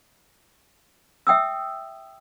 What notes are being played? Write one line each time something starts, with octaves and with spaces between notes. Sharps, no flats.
E5 G5 D#6 E6